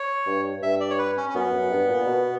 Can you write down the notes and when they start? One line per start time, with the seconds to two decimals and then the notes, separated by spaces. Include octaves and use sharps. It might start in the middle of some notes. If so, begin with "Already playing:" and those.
Already playing: C#5
0.26 G2
0.62 G2 E5
0.80 D5
0.90 C#5
0.99 B4
1.17 C#4
1.29 C#4
1.35 F#2 B3
1.53 F#2
1.70 G2
1.88 A#2
2.06 B2